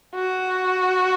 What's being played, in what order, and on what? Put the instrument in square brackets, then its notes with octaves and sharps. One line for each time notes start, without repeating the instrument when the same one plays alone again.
[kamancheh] F#4